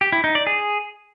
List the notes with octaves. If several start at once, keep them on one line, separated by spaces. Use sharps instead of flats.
G4
E4
D#4
D5
G#4